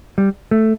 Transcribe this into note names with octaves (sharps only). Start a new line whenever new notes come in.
G3
A3